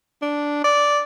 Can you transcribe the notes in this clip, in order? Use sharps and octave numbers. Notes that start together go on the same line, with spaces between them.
D4
D5